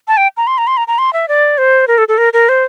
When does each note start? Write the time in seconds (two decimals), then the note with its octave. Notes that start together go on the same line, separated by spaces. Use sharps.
0.08 A5
0.17 G5
0.37 A#5
0.47 C6
0.58 A#5
0.67 C6
0.77 A#5
0.88 A#5
0.98 C6
1.13 E5
1.28 D5
1.58 C5
1.88 A#4
1.98 A4
2.08 A4
2.18 A#4
2.33 A#4
2.49 C5